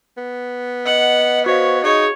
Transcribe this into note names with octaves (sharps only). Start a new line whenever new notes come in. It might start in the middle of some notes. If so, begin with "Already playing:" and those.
B3
D#5 F#5
F#4 C5 C#5 D#5 F5
D#4 G#4 C#5